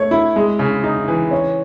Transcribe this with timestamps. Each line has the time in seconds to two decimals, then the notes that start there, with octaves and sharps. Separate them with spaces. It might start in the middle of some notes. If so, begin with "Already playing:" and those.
Already playing: A3 C#5
0.11 E4
0.36 G#3
0.59 C#3
0.84 D#4
1.08 E3
1.31 C#4